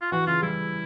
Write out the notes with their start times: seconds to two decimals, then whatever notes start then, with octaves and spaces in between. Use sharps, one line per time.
0.01 F4
0.12 E3 F#4
0.27 C#3 F4
0.42 G3 E4